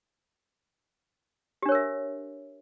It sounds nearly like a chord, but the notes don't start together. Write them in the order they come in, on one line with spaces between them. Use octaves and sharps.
G4 D4 C#5 A#4 E5